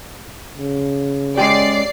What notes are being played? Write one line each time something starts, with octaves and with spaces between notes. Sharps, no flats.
C#3
G#3 C#4 G4 D5 C7